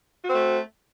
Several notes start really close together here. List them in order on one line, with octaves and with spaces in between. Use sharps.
F#4 C4 A3